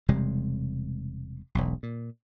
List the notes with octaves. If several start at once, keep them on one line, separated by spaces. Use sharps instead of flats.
E1 C3 G3 G#3
E1 B1
A#2